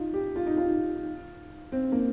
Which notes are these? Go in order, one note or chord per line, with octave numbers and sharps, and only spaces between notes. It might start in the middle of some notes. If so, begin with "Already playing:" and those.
Already playing: D#4 F4
G4
F4
D#4
F4
C4
A#3